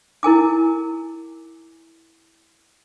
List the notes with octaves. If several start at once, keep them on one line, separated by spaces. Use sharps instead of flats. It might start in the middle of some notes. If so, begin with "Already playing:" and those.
E4 A#4 G#5 D6